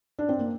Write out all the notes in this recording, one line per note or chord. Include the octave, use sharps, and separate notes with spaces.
D4
C4
A#3